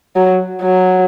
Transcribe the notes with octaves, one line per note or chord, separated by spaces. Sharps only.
F#3
F#3